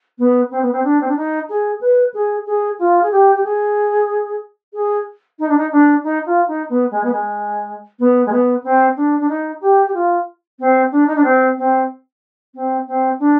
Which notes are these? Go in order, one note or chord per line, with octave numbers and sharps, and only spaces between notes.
B3
C4
B3
C4
D4
C4
D4
D#4
G#4
B4
G#4
G#4
F4
G#4
G4
G4
G#4
G#4
D#4
D4
D#4
D4
D#4
F4
D#4
B3
G#3
B3
G#3
B3
G#3
B3
C4
D4
D4
D#4
G4
G4
F4
C4
D4
D#4
D4
C4
C4
C4
C4
D4